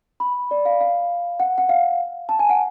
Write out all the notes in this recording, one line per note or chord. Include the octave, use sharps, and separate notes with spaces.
B5
D5
F5
F5
F#5
F#5
F5
A5
G#5
F#5